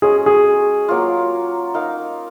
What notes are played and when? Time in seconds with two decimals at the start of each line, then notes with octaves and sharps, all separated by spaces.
0.02 G#3 C#4 F#4 G#4
0.26 G#4
0.88 F#3 A#3 F4
1.74 D#4 A#4 F5